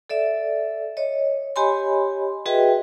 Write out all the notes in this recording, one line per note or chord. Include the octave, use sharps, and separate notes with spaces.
A4 D5 E5
C#5 D#5
G4 C#5 D#5 G#5 B5 C6
F#4 G#4 B4 D#5 E5 G5